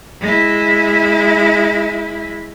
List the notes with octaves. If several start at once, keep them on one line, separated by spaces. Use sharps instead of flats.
G#3 E4